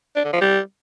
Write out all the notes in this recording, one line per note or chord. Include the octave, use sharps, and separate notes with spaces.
D4
D3
F3
G3